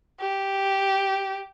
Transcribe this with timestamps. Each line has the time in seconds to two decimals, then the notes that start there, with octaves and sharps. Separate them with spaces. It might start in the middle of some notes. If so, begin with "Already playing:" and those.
0.20 G4